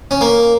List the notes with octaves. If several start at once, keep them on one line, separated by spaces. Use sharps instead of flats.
C#4
A#3